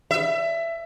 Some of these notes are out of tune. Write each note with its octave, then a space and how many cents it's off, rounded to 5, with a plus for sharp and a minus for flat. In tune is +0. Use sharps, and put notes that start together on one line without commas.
E5 +20